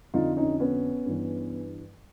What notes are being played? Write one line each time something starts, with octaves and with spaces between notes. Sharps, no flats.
F2 D3 F3 D#4 F4
C#4 D#4
B3 C#4
G2 E3